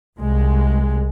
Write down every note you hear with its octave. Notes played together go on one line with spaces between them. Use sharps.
C2 G#3